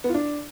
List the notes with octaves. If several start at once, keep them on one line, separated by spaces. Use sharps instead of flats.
B3
F4
D4